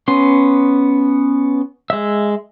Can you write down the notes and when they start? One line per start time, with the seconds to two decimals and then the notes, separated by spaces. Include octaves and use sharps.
0.08 B3 C#4 C6
1.90 G#3 E5